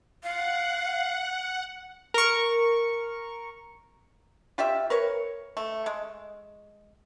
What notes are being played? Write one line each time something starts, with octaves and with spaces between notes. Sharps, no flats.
F5 F#5
A#4 C#6
F4 G4 D5 E5
A#4 B4 C#5
A3
G#3